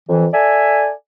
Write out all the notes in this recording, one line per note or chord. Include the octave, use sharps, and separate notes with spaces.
F2 E3
A4 D5 E5 G#5